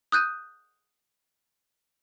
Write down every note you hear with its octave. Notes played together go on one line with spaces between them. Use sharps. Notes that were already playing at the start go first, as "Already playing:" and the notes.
D#6 F#6 G6 D#7